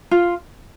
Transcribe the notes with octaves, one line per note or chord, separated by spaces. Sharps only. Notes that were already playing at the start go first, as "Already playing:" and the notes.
F4